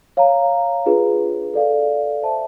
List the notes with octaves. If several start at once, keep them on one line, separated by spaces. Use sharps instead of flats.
C#5 F5 A#5
D4 F4 G#4 B4
A4 D5 F5
C5 E5 A5